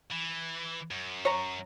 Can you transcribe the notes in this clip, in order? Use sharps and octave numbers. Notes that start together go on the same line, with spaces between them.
E3
F#2
C#5 A#5